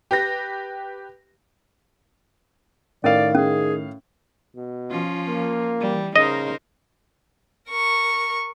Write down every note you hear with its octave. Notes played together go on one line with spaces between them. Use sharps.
G4 B4 A#6
A2 D#3 C#4 A#4 D5 F5
C#4 G#4
B2
F3 C#4 F4
A#3
E3 G3
C#3 D#4 A#4 C5 D#5
A#4 C#6